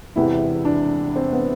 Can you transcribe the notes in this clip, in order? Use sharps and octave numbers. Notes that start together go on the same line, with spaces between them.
E1 E2 C3 E3 E4
D4
C4
B3